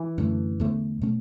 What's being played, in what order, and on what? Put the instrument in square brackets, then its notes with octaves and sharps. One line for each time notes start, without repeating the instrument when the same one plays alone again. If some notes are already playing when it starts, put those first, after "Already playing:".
Already playing: [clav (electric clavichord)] E3
[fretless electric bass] F#2 D3 A3
E2 D3 A3
B2 A3 C#4